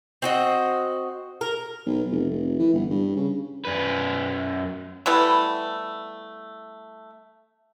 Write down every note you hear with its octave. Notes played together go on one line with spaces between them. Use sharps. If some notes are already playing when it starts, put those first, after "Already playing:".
C4 F#4 D#5
A#4
B1
F1
F1
E3
G1
G2
C#3
F#2 B4
E3 G3 A3 B3